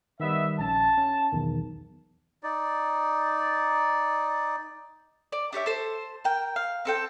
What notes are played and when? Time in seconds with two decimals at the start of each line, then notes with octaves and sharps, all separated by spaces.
0.20 D#3 G3 B3 D#5 E5
0.59 A#1 C#4 A5
0.98 C#4
1.32 B1 E2 D#3
2.43 D#4 D5
5.32 D5
5.53 D4 G4 C#5 E5
5.66 A4 C5
6.24 A#4 G5
6.56 F5
6.85 C4 A4 G5